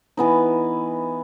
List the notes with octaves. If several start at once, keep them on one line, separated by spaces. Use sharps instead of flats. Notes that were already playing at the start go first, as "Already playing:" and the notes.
E3 B3 D#4